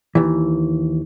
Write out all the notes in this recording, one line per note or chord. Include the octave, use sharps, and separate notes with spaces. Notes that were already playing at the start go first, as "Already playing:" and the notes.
D#2 E3